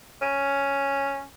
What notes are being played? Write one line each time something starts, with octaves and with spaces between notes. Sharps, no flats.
C#4